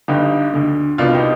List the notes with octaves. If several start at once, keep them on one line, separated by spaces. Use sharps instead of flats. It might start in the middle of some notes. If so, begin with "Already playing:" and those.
G1 G2 D3 D#4 G4
D2 D3
C2 B2 D4 F4
D#4 G4